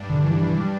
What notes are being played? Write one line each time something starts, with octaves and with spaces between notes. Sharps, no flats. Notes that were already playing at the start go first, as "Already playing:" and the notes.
Already playing: G2 G3 D4
D3
E3
E3
E3
G3